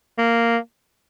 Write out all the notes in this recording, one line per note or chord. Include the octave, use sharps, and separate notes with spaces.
A#3